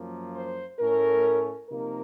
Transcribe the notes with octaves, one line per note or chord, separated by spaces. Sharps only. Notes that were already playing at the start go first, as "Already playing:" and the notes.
Already playing: F#2 F3 A#3
C5
A2 A3 C#4 A#4
C3 F3 A#3 D#4 A#4